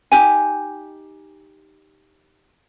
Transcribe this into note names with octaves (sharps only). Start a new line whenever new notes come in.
D#4 G4 G#5